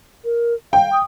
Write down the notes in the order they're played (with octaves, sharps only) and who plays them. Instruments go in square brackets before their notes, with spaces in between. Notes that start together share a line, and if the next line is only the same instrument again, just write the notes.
[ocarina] A#4
[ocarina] F5 [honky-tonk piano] G5
[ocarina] D#6